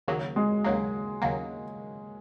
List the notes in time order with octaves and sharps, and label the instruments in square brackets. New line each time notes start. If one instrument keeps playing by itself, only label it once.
[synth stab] D#2 C#3 F#3 A#3
[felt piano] G#3
[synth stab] D#2 C#3 F#3 A#3
D#2 C#3 F#3 A#3